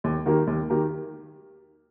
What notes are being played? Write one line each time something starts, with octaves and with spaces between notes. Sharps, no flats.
D#2
D#3 A#3 G4 A#4
D#2
D#3 A#3 G4 A#4